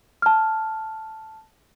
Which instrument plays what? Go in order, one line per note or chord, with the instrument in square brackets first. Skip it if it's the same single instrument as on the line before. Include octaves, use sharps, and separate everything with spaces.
[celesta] A5 F6